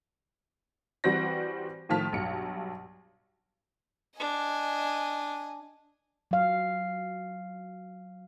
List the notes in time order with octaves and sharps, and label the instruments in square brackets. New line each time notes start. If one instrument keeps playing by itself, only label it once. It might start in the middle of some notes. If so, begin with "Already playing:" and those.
[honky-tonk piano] E3 G3 C4 F#4 C5 A#6
A2 D#3 F3 A5 F6 B6
B1 G2 C#7
[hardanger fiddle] D4 [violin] D#5 G#5
[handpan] F#3 F5